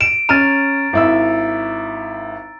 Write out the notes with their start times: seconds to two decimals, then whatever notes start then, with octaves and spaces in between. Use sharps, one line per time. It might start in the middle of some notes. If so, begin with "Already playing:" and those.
0.01 D7 E7
0.29 C#4 A#5 F6 A6 D#7
0.93 G#1 E4 E6